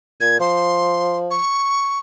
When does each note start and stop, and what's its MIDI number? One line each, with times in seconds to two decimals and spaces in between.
0.21 0.37 46
0.21 0.40 92
0.40 1.37 53
0.40 1.17 84
1.31 1.99 85